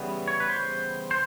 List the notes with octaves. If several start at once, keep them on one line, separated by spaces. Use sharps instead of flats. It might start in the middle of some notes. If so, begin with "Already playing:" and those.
Already playing: C#3 E3 G3 B3
C#5
B4
C5
C5